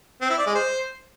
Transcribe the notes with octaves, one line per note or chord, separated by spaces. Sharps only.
C4
E4
D5
G#3
C5